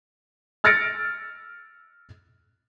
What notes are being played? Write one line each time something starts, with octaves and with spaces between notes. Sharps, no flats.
E6 F6 A6 A#6 C#7 D7